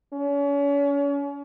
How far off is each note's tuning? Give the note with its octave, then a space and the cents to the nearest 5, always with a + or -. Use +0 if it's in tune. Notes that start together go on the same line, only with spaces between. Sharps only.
C#4 +35